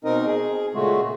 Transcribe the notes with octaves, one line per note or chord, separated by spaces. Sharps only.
B2 C4 D#4 A#4 D#5
G#4
A#2 C#3 G#3 A3 F4 F#4